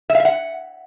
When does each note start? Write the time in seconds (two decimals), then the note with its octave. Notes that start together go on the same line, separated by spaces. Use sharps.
0.10 E5
0.15 F5
0.20 E5
0.25 F#5